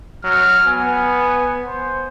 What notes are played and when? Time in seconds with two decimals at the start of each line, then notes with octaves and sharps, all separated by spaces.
0.24 F#3 F6
0.67 B3 G#5
1.66 C5